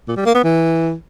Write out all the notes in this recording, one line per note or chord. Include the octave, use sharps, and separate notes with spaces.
A#2
G3
A#3
B3
E3